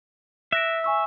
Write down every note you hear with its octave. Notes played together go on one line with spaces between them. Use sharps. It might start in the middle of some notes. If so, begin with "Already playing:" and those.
E5 F#6 A#6 D7
G#5 C#6 E6